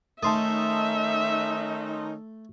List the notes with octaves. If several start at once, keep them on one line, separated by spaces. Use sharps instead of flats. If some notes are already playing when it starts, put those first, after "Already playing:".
D#3 A3 C#4 D#4 E5 A5 C6 D#6